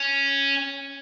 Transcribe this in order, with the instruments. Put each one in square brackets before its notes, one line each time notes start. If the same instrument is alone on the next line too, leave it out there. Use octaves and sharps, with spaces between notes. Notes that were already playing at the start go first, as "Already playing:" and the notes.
Already playing: [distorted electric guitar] C#4